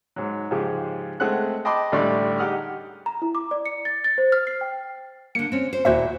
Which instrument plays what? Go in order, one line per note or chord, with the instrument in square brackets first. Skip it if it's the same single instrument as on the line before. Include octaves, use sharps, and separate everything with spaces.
[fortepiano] G#2 F#3
G#2 C#3 F3 G#3 G4
G#3 A3 C4 F#5 F#6
D#5 G5 A5 B5 C6 D6
A1 D3 G3 D5 C6 C#6
D#4 G4 G#4 F#5 D#6 F6
[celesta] A#5
E4
D6
D5
C#7
A6
A6
C5
F6
C7
G5
[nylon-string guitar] D3 A#3 [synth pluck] C#7
[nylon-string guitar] C4 C#4
C5
[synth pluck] D#2 C5 E5 [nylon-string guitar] A#2 E4 F#4